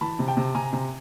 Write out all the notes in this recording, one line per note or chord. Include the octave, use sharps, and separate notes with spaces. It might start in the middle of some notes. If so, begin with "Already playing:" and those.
E3 A5 B5
C3
G5 A5
C3
C3 G#5 A#5
C3